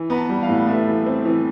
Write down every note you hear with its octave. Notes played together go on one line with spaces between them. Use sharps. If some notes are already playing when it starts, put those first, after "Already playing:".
Already playing: E3
B3 A#5
A5
G3
F5
A2
A3 E5
E3
C4
E3